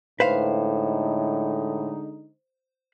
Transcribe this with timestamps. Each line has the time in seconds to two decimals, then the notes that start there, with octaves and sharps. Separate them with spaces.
0.20 A2 D3 G#3 D#4 B4 C5 F5